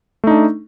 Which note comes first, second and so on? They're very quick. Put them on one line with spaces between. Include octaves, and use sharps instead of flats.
A3 D#4 D4